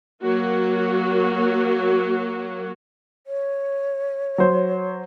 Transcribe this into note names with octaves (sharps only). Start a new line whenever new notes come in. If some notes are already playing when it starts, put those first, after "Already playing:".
F#3 A#3 F#4
C#5
F#3 C5